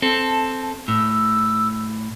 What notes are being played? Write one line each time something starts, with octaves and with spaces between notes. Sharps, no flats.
C4 A4 A5
A2 E6